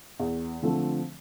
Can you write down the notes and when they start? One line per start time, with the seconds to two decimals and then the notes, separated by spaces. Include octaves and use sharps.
0.19 E2
0.62 D3 F3 A3 C4